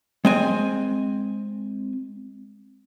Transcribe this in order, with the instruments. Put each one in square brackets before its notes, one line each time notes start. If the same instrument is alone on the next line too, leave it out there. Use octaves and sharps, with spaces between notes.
[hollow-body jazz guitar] G#3 C4 G#5